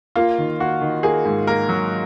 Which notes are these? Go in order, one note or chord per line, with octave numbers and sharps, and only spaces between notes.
A#3 F4
D#3
A#3 F#4
D#3
A#3 G#4
G#2
A#3 A#4
F#3